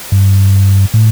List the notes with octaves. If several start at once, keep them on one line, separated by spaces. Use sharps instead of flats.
G2
A2